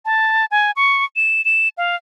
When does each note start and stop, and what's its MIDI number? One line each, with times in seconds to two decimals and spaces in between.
0.05 0.45 81
0.51 0.71 80
0.76 1.05 85
1.16 1.44 100
1.45 1.69 100
1.78 1.96 77